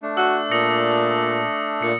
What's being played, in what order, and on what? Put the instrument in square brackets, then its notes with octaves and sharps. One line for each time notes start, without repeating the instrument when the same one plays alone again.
[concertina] A3 D4
[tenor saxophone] F#4 [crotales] E6
[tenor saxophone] A#2 [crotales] D#6 A#6 C#7
[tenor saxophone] A#2 [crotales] C#7